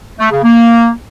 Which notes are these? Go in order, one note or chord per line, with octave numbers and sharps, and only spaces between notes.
A3
C#3
A#3